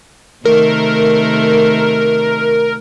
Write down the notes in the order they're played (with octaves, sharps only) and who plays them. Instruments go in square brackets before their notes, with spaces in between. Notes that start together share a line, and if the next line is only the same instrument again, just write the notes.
[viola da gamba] C3 D#3 A3 [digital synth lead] A#4